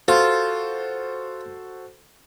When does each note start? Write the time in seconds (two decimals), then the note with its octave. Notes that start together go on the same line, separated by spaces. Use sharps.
0.08 F4 F#4 A4 C5